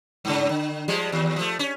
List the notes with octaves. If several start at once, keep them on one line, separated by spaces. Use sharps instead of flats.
G2 C#3
D3
F3 G3 G#3
D#2
F3 A3
C#4